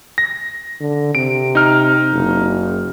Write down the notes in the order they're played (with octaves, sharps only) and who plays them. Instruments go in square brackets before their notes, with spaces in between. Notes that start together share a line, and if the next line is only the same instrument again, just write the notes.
[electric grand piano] A#6
[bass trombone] D3
[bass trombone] C3 [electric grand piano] D7
[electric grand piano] D#4 F6
[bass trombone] F#1